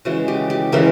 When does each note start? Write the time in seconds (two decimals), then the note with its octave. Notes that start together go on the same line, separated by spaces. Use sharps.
0.05 C#3 E3 G#3 F#4
0.28 G4
0.50 G4
0.72 C#3 E3 G#3 A#4